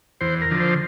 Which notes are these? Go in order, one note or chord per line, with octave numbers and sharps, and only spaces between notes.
E2 C5
A#4
D3 F3
C5